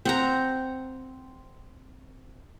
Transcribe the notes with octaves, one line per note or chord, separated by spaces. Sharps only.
C4 F#5 A#5